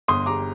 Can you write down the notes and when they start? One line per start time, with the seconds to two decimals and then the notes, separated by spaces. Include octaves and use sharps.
0.08 G1 C6 D#6
0.26 G3 A#5 D6